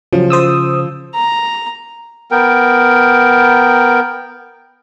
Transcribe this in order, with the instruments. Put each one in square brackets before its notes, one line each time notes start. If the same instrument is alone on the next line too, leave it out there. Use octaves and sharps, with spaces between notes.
[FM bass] C#3 [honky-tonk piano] F3 [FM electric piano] F#3
[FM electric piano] C5 D#6 E6
[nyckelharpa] A#5
[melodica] B3 A#4 G5